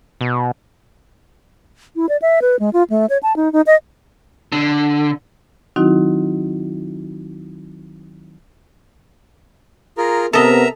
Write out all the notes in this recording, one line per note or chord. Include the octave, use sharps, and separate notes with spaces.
B2
E4
D5
E5
B4
G#3
F4
A3
C#5
A5
D#4
D#4
D#5
D3
D#3 F#3 C4 D#4 E4 F#4
F4 G#4 A#4 A#5
C3 B3 A4 A#4 D#5 E5 A#5